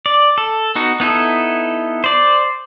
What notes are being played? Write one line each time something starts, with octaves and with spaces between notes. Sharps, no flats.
D5
A4
B3 D#4 F#4
B3 D#4 E4 A4
C5 D5